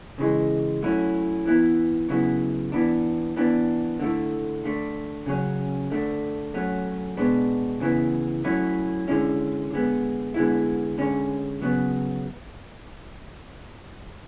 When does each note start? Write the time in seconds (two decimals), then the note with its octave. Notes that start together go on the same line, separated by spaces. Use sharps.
0.18 C#3 E3 G#3
0.83 F#3 A3 C#4 E4
1.46 E3 B3 E4
2.09 C#3 F#3 B3 E4
2.72 E3 B3 D4
3.37 E3 B3 D4
4.00 D3 A3 E4
4.63 D3 A3 D4
5.26 C#3 F#3 C#4
5.90 D3 A3 D4
6.54 F#3 A3 C#4
7.17 B2 G#3 B3 D4
7.80 C#3 E3 B3 E4
8.44 F#3 A3 C#4 E4
9.08 D3 G#3 C#4 E4
9.71 D3 G#3 B3
10.34 D3 G#3 B3 E4
10.98 D3 G#3 C#4
11.62 C#3 F#3 B3